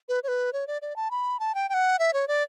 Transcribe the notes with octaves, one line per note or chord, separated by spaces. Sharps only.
B4
C#5
B4
C#5
D5
D5
A5
B5
A5
G5
G5
F#5
E5
C#5
D5